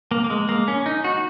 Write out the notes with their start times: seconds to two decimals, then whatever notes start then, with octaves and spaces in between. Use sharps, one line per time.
0.11 A#3
0.24 A#3
0.30 G#3
0.49 A#3
0.68 C#4
0.86 D#4
1.04 F#4